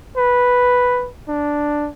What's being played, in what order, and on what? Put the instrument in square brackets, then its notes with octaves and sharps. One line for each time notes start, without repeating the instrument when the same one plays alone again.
[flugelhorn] B4
D4